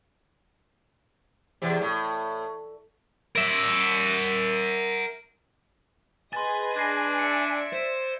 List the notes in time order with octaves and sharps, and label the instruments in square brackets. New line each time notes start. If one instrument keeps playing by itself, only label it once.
[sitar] E2 C3
A2
[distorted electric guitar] A#4 E5
[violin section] G#4 B4 D#5 [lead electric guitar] G#5 [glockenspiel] C6 A6
[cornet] D4 [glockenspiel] G#6 A#6 C7
[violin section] D5 E5 [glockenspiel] C#7
[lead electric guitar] C5